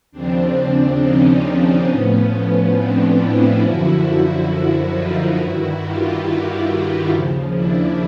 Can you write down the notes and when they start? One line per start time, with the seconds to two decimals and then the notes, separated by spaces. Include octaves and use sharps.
0.12 D#2 C#3 F3 C4 D4
0.55 C4 D4
0.99 C#4 D#4
1.86 A2 F3 B3 C#4
2.74 C4 D4
3.17 D4 E4
3.60 F#2 D3 F3 E4 F#4
4.04 E4 F#4
4.48 E4 F#4
4.91 D#4 F4
5.34 G2 D#3 E4 F#4
5.79 F4 G4
6.22 E4 F#4
7.09 D#2 C#3 F3
7.53 D4 E4